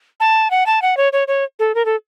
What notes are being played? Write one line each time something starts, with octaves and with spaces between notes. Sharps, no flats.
A5
F#5
A5
F#5
C#5
C#5
C#5
A4
A#4
A4